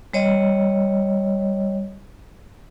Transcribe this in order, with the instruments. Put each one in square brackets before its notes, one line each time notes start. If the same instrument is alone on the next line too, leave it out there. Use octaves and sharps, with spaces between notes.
[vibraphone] G3 C#5 D#5